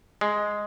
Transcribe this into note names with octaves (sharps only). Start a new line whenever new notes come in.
G#3